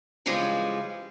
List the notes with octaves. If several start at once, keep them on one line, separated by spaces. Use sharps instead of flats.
C#3 E3 F3 G3 G#3 B4